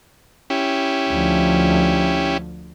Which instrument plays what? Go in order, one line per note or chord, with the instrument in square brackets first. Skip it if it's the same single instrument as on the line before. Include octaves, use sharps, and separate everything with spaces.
[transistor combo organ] C#4 E4 G4
[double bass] D2 F3